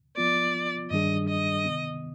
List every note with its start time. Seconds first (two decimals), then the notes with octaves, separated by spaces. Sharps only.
0.17 F3 B3 F4 D5
0.91 G2 D#3 G3 D4 G#4 D#5
1.29 D#5
1.65 C3 D#3 B3